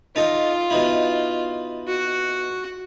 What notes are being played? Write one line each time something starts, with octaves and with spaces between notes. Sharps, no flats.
D#4 F4 A4 D#5
B2 D#4 E4
F#4